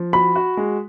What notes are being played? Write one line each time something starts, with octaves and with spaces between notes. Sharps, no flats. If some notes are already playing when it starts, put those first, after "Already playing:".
Already playing: F3
F#4 B5
F#4
G#3